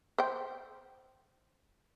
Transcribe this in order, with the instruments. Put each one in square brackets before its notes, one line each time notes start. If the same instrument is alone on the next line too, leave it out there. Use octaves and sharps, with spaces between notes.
[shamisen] C5 G5